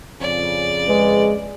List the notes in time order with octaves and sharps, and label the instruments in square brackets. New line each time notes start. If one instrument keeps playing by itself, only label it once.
[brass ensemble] F2 C#3 [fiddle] D5
[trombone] G#3 [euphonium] B4